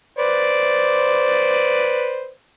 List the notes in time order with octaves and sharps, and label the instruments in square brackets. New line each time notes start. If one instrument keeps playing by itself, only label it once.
[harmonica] B4 C5 D5